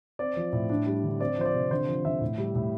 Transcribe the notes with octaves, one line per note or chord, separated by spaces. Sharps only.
C4 D5
F3
A2
D4
G3
D3
C4 D5
F3 C5
D5
C3
D3 C5
F3
D3 E5
A2
G3
A2